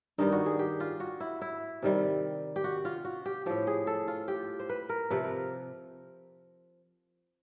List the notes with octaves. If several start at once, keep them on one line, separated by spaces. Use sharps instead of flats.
G2 D#3 G3 D#4
F#4
G#4
G4
F4
F#4
E4
E4
C3 D#3 G3
G4
F#4
F4
F#4
G4
A2 F3 G4
G#4
A4
F4
G4
C5
B4
A#4
C3 F3 B4
A#4